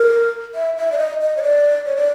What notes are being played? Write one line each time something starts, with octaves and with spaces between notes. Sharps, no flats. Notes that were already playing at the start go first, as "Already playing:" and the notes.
Already playing: A#4
E5
E5
D5
D#5
D#5
C#5
D5
C#5
D5